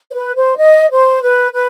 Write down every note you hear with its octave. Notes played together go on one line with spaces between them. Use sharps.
C5
B4
C5
D#5
C5
B4
B4